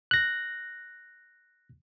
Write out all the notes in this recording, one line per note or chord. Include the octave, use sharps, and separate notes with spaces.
F#6 A#6